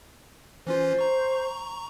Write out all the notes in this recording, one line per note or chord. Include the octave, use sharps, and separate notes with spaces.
E3 C#4 F4 C5
A#5 C#6